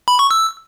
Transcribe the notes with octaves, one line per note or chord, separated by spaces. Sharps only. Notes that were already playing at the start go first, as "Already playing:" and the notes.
B5
C#6
E6